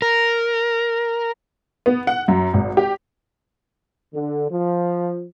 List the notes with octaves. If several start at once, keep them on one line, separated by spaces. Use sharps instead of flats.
A#4
B3
F#5
F#2
G#1
G4
D3
F3